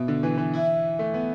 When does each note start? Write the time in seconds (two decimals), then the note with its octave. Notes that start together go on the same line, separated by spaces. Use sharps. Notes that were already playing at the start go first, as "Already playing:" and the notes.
Already playing: B2 E4
0.08 D3
0.23 E3
0.38 E3
0.53 E4
0.99 A3
1.14 B3